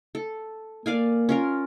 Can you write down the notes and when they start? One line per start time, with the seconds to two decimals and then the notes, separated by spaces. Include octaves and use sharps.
0.15 A4
0.86 A#3 D5 F5 G#5
1.29 C#4 F4 A#4